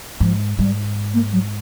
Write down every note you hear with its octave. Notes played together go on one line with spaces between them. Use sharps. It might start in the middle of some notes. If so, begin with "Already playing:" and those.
G#2 F3
G#2 G3
A#3
F#3